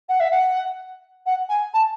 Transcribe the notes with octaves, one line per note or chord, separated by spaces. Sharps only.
F#5
E5
F#5
F#5
G#5
A5